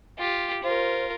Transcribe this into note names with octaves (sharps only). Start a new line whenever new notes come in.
F4 G4
F4 A#4 C5